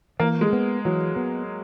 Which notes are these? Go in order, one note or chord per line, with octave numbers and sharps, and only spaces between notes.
E3 A#3
G#3
B3
E3 F#3
B3